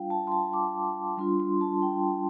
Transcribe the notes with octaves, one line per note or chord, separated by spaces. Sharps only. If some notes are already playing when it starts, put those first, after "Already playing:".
Already playing: G3 D4 F4 F5 G5
A5
C6
A5
D6
G3 D4 F4 C6
C6
A5
G5